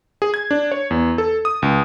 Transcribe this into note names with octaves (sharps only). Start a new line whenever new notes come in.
G#4
G#6
D4
C#5
E2
A4
D#6
C#2